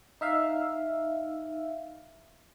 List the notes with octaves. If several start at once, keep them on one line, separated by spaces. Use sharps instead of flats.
D#4 E5 F5